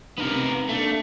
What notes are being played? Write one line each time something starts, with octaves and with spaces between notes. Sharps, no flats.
C3 B3 D#4 A#4
A3 A#3 D4